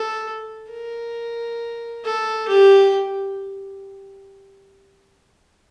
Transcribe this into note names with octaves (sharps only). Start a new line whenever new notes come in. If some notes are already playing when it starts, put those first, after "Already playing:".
Already playing: A4
A#4
A4
G4